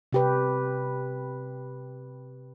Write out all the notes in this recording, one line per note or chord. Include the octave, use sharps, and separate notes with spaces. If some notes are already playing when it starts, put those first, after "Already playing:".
C3 G4 B4